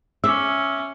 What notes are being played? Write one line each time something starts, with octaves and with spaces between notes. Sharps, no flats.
C#4 E5 D6 E6